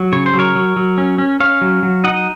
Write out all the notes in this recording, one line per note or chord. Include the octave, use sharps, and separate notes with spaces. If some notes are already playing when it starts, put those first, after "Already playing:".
Already playing: F#3
C#3 C#5
C5
F#3
A#4 C#5
F#3
F#3
C#4
C#4
C#4 C#5 F5
F#3
F#3
D#4 D#5 F#5